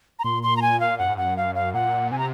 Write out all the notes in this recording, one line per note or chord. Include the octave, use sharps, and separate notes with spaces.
A#5
A#2 C6
C6
A#5
G#5
F5
F#2 F#5
G#2
F#2 F#5
F5
F5
A#2 F#5
C3 G#5
A#5